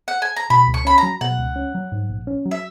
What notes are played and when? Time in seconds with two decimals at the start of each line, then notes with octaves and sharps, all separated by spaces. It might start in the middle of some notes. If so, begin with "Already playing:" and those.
0.08 F#5
0.22 G#5
0.36 A#5
0.50 B2 B5
0.67 C#2
0.74 C#6
0.85 C#4 B5
0.98 F#3 A#5
1.21 B2 F#5
1.38 C#2
1.56 C#4
1.75 F#3
1.92 G#2
2.09 A#1
2.27 C#4
2.45 F#3
2.51 E5